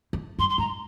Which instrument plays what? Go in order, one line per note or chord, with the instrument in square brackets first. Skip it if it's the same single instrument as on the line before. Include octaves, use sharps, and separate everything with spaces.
[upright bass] F2
[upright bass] G2 [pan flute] C6
[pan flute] C6
[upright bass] G#2 [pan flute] A#5